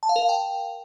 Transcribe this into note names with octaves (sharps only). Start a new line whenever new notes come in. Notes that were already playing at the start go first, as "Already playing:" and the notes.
A5
F5
A#4
F5
G5